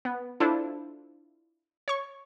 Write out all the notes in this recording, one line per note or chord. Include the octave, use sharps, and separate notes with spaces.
B3
D4 E4 F4 A4 C5
C#5 C#6